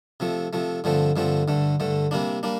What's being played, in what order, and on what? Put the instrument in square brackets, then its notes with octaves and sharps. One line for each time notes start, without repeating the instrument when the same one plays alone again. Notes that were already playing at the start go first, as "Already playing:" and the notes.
[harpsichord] C3 F3 A3
C3 F3 A3
G2 D3 F3 A3 C4
G2 D3 F3 A3 C4
G2 D3 A3
G2 D3 A3
C3 G3 A#3 D4
G3 A#3 D4